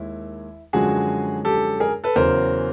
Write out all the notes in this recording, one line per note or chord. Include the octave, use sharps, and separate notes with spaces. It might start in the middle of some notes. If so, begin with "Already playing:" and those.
Already playing: D#2 D#3 G#3 E4
F#2 D3 F3 G#3 F#4 G#4
G4 A4
G#4 A#4
A4 B4
E2 C#3 F#3 A#4 C5